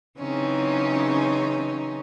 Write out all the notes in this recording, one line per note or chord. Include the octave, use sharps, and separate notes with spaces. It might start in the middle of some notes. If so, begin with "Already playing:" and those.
C#3 E3 F#3 C4 C#4 D#4